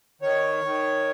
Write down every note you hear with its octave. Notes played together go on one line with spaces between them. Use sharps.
D#3 C#5
D#3